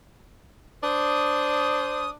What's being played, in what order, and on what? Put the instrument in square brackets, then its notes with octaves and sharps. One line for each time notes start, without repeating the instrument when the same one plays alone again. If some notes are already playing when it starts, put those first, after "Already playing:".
[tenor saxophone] D4 [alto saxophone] C5 [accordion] D#6